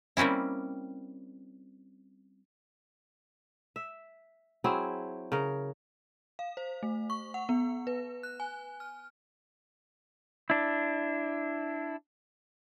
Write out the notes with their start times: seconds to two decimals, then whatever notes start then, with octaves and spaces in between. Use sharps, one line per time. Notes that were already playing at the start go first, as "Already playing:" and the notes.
0.17 G3 A#3 C4 C#4 E4
3.76 E5
4.64 F#3 C4 E4 G#4
5.32 C#3 A#4
6.39 F5
6.57 C5
6.83 A3
7.10 C#6
7.34 F#5
7.49 B3
7.87 B4
8.23 F#6
8.40 G#5
8.80 F6
10.50 D4 E4